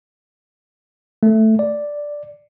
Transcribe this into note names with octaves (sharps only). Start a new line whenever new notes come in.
A3
D5